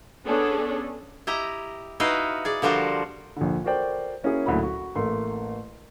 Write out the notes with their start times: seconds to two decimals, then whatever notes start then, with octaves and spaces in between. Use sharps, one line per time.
0.25 B3 C#4 D4 G#4 A4
1.27 E4 G4 D#5 A#5
2.00 D#4 E4 F#4 B4 D#5 F5
2.45 G#4 D5
2.62 D3 F3 G3 F#4 A#4 C5
3.36 A#1 D3
3.64 F#4 A4 A#4 C5 D5 G5
4.24 A#3 C#4 E4 F#4 G#4
4.46 D1 D2 A#2 E4 B5
4.63 F#4
4.95 A1 A3 A#3 C6